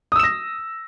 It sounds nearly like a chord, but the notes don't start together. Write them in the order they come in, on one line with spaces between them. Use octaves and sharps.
D#6 E6 E7 A#6